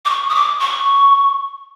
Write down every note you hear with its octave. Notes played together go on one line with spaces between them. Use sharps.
D6
C#6
D#6
D6
C#6